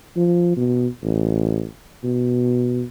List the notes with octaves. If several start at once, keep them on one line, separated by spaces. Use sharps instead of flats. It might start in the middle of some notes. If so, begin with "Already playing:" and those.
F3
B2
A1
B2